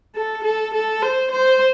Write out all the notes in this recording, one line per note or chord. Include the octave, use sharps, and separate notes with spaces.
A4
A4
A4
C5
C5